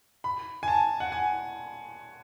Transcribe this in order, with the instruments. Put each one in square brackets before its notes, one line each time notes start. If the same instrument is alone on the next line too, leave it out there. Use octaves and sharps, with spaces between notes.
[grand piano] B5
G#5
A5
F#5
G#5